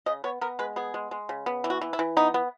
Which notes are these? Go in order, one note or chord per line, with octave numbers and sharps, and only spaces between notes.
C#3 D#5
B3 C#5
B3 A#4
G#3 B4
B3 G#4
G#3
G#3
C#3
B3
E3
F#4
E3
E4
E3
B3 D#4
B3